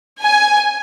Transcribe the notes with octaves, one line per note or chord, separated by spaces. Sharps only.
G#5